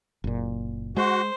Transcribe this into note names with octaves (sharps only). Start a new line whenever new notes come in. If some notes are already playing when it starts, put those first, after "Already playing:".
F#1 A#2
G#3 F#4 C5